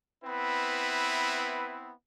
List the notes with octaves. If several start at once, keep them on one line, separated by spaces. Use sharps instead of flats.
B3 C4 E4 B4